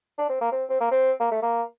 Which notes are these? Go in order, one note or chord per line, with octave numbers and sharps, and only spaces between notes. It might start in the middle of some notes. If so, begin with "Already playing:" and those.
D4
C4
A#3
C4
C4
A#3
C4
A#3
A3
A#3